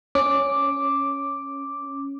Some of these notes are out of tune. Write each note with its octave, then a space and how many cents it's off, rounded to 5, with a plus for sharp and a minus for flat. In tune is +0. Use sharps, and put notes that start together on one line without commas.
C#4 +0 D6 +0